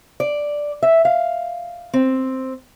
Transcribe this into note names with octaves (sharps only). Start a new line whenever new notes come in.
D5
E5
F5
C4